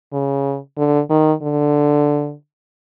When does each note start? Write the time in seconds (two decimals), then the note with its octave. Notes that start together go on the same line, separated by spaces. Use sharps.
0.12 C#3
0.77 D3
1.10 D#3
1.42 D3